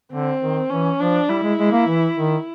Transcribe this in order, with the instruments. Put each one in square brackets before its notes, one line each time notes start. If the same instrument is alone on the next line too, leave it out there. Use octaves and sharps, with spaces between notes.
[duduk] D3 [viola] C4
[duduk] D#3
[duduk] E3 [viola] C#4
[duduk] F3 [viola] D4
[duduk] G3 [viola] E4
[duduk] G#3
G#3
A#3
E3
D#3